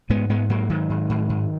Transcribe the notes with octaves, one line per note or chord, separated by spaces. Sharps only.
G#2 G#3 B3
G#2 G#3 B3
G#2 F#3 A#3
G#2 D#3 F#3
G#2
G#2
G#2